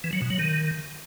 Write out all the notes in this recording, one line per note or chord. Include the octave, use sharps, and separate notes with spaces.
E3
F#3
B2
F#3
D#3